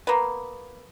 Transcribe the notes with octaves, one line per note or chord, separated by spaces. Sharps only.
A#3 B3